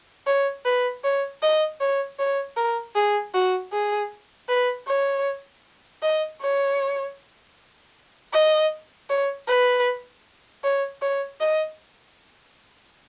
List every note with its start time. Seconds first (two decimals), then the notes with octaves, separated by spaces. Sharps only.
0.27 C#5
0.65 B4
1.04 C#5
1.42 D#5
1.81 C#5
2.19 C#5
2.57 A#4
2.95 G#4
3.34 F#4
3.73 G#4
4.49 B4
4.88 C#5
6.02 D#5
6.42 C#5
8.33 D#5
9.10 C#5
9.48 B4
10.64 C#5
11.02 C#5
11.40 D#5